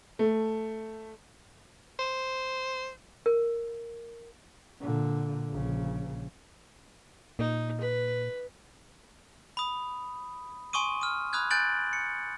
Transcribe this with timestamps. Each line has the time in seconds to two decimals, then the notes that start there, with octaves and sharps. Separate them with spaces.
0.19 A3
1.99 C5
3.26 A#4
4.82 A#2 D3
5.51 A#1 C#3
7.39 A#2 D#4
7.81 B4
9.57 B5 D#6
10.73 G#5 C6 C#6 D#6 D#7
11.01 D#6 F6
11.33 B5 D#6 F6 F#6 G#6
11.51 G#5 F#6 G6 A6 D7 F#7
11.93 C#7